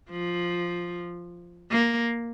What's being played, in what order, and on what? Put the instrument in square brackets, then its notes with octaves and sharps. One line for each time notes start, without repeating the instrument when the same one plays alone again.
[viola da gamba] F3
A#3